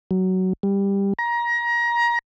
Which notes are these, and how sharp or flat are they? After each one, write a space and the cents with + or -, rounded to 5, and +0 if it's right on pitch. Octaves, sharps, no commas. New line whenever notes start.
F#3 +15
G3 +15
A#5 +25